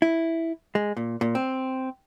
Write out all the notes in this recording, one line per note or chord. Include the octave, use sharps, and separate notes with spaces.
E4
G#3
A#2
A#2
C4